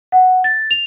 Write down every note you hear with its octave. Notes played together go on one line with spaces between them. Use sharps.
F#5
A6
F7